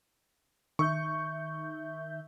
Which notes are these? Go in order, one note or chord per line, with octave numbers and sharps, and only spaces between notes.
D#3 E5 C#6 G6